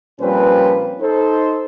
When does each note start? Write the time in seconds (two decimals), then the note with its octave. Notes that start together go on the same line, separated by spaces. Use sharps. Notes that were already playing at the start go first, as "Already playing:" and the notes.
0.20 A#2 F3 G3 C4 C#4 B4
1.01 D#4 A4 C5